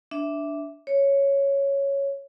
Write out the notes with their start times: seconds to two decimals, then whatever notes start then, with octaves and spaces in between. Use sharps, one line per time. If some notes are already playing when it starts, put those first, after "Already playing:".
0.11 D4 E5
0.87 C#5